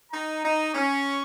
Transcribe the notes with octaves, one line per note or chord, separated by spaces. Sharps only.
D#4 A#5
D#4
C#4 C#6